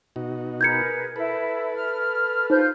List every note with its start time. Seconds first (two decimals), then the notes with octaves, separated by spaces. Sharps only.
0.16 B2 D#4 F#4
0.61 G#4 A#4 B4 G6 G#6 C#7
1.16 E4 A4 B4
1.75 F6
2.50 D#4 F4 C5 F6 G6